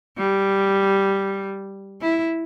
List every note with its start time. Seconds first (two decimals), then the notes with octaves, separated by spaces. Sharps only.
0.18 G3
2.01 E4